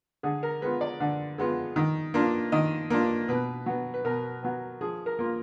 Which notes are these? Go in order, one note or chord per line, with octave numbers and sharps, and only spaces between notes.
D3 G#4
A#4
G#3 B3 F4 B4
D5
D3
G#3 B3 F4
D#3
A#3 D4 F4
D#3 D#5
A#3 D4 F4
B2 B4
F#3 B3
B4
B2 A#4
F#3 B3
F3 G#4
A#4
A#3 F4